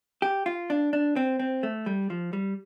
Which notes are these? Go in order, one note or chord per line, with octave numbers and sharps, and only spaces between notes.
G4
F4
D4
D4
C4
C4
A3
G3
F3
G3